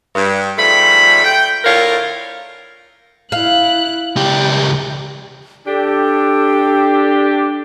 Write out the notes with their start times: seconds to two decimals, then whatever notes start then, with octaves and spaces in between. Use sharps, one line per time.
0.15 G2
0.58 G#2 F3 G3 A3 B5
1.24 G5
1.65 A2 D3 F4 A#4 C#5 F5
3.32 E4 F5 F#6
4.17 C#2 G4 D5
5.67 D4 G4 A4